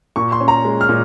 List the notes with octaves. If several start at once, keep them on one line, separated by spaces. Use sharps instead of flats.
A#2 C#6
C6
C#4
A#5
G#3
F6
A#2